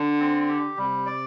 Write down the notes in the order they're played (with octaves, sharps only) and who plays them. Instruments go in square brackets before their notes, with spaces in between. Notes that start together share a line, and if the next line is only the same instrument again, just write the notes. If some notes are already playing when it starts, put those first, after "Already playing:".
Already playing: [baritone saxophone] D3
[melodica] C4
G4
[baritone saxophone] C3 [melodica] G3
[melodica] D5